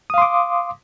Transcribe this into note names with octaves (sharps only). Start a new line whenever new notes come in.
F5 C6 D6 D#6